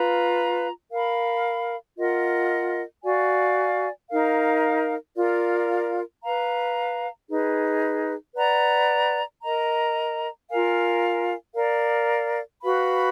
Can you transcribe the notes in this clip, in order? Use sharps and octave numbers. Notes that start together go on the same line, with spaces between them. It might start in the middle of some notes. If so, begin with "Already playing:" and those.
Already playing: F4 B4 F5 A#5
A#4 F5 B5
F4 A#4 D#5 F#5
F#4 D5 F5 G#5
D#4 A#4 F5
F4 A#4 D5 F5
B4 F5 A#5
D#4 G#4 B4
B4 D5 F#5 A#5
A#4 D#5 A#5
F4 A#4 F5 G#5
A#4 D5 F5
F#4 B4 F5 B5